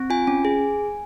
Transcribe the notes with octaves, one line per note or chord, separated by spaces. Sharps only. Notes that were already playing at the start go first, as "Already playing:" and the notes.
Already playing: C4
F4 G#5
C#4
G#4